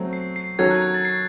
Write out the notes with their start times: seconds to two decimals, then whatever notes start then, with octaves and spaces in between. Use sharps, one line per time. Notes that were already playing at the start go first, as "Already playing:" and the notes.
Already playing: F#3 A3 C4
0.13 C7
0.36 C7
0.59 D#3 F#3 C#4 F#4 A4 G#6
0.71 F#6
0.82 G#6
0.94 A6
1.05 C7